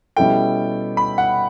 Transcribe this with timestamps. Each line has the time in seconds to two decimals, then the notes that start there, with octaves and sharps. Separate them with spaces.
0.17 B2 G3 C#4 E4 A4 G5
0.97 B5
1.18 F#5